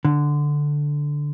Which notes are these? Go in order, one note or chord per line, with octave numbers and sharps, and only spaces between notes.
D3